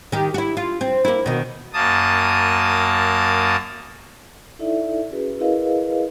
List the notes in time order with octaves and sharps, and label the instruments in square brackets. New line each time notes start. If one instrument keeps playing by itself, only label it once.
[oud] D#3 G4
E4 F#4
F4
C4
A#3 E4
B2 D#3
[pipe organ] F#2 A#3 A5 D#6
[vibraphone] D#4 E4 A4 D5 E5
C#4 F#4 G#4 B4
E4 G#4 A#4 B4 D#5 F5